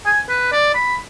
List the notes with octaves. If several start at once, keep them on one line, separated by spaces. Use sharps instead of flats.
G#5
B4
D5
B5